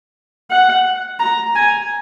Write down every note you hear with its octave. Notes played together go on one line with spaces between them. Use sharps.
F#5
A#5
G#5